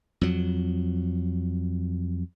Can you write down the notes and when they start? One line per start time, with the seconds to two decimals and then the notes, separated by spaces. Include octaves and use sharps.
0.21 F2 F#3